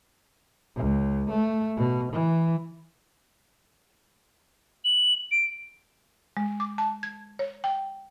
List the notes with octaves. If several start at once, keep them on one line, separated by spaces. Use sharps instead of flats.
C#2
A3
B2
E3
F#7
D7
G#3
D6
A5
G#6
C#5
G5